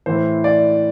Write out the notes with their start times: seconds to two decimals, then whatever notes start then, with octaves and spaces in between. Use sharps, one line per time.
0.06 A2 E3 C5
0.44 D5